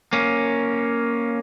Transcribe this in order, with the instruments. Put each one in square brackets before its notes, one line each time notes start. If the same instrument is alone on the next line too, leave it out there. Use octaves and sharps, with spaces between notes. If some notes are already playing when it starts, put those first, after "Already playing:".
[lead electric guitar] A#3 C#4